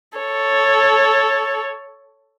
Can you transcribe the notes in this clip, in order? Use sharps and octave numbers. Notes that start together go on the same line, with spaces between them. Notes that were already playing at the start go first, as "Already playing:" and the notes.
A4 C#5